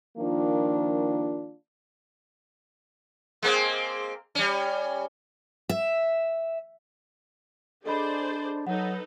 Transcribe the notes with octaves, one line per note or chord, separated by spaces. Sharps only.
D#3 F3 A#3 D4 F4
G#3 A#3 C4
G3 C#4
E5
D4 G#4 A4 C5 D5 D#5 B5
F#3 D#4 A4 B4 F#5